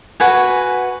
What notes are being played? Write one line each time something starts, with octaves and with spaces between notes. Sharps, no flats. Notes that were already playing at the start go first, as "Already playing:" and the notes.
F#4 B4 G#5